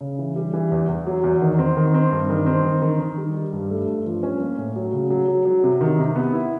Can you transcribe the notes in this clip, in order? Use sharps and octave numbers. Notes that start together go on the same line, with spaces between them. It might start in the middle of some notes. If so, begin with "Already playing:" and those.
C#3
E3
G3
E3
E2
E2
F#3
E2
D#3
C4
D#3
C4
G2
D#3
C4
D#3
D#3
D#3
G3
G3
G2
A3
G2
F3
C#4
A#3
A2
F#3
C#3
F#3
F#3
F#3
C3
D#3
C3
B3
E4